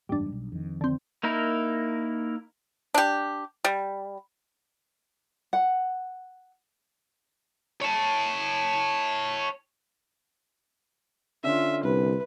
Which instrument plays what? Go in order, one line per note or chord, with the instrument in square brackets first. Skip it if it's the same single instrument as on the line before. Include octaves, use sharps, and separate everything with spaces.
[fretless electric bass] F#1 E2 G#2 [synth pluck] G3 D4
[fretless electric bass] B1
F2 D#3
[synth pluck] D3 C4
[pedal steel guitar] A#3 D#4 E4 A#4
[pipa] D4 G4
G3
[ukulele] F#5
[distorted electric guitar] C#5 A5
[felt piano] D3 C#4 [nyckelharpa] F4 E5
[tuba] C2 [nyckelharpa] B4